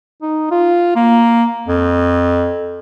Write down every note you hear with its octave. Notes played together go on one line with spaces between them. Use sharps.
D#4
F4
A#3
F2